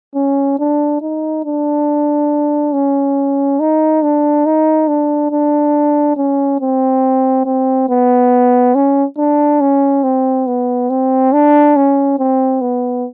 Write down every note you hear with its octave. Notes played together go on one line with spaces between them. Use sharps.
C#4
D4
D#4
D4
C#4
D#4
D4
D#4
D4
D4
C#4
C4
C4
B3
C#4
D4
C#4
C4
B3
C4
D4
C#4
C4
B3